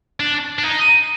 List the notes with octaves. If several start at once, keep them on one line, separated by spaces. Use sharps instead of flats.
D4
D4
D#4